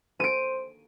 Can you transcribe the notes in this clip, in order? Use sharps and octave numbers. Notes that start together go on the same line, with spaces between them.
C5 D7 D#7